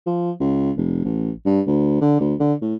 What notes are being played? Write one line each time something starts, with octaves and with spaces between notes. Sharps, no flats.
F3
C#2
F1
A1
G2
D2
D3
D2
D3
A2